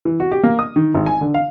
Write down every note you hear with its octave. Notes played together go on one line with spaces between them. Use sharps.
E3
F#4
G4
A#3
D#6
D#3
G#1
G#5
D3
F5